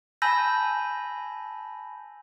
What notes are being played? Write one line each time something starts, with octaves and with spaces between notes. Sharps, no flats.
G#5 A5 B5 E6 G6 A#6